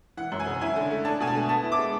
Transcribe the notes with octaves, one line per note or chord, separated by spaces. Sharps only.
E3 F#5
F#2
G#5
C#3
E4 G#5
D3
A3
D4 A5
B2 G#5
A5
A3
B3 A5
E4
D6
G#3